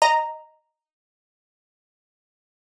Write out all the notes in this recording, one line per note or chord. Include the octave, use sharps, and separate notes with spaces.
D#5 A#5